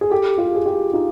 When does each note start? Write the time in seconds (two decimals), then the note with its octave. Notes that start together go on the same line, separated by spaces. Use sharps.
0.01 G#4
0.10 G4 A4
0.38 F4 G4
0.55 G#4
0.66 F4 G4
0.93 D#4 F4